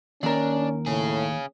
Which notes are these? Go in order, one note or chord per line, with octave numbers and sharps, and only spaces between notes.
D#2 C#4 D4 A#4
A2 C#4 G#4